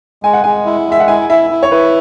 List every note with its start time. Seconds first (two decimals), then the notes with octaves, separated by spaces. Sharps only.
0.23 G#3 G#5
0.33 F#5
0.44 G#3 G#5
0.66 E4
0.87 G#3 E5
1.00 F#5
1.08 E4 G#5
1.30 E4 E5
1.50 E4
1.63 C#5
1.72 E4 B4